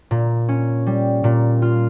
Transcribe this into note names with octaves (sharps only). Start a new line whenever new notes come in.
A#2
C#4
G3
A#2
F4